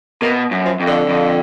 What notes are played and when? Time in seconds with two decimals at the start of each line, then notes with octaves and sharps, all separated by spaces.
0.22 B2 A#3
0.51 F#2
0.66 F3
0.80 F2
0.87 D3
1.09 F2